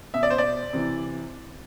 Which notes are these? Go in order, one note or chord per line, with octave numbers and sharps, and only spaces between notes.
B2 E5
D5
C5
D5
C3 E3